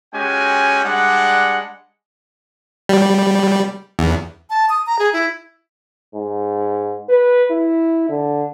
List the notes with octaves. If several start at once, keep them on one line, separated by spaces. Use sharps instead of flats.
G#3 C#4 F#4 G4 G5 G#5
G3 G#3 D4 F#5
G3
E2
A5
D#6
A#5
G#4
E4
G#2
B4
E4
D3